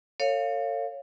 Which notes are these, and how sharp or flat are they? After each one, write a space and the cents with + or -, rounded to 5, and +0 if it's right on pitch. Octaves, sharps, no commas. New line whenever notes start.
A4 +45 C#5 +0 F5 +0